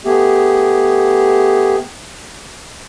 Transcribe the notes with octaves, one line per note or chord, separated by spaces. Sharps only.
A3 B3 G4 G#4